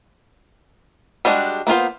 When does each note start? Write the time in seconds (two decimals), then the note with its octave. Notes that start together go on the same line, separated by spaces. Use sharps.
1.25 G3 G#3 D4 F#4
1.67 A#3 B3 F4 C5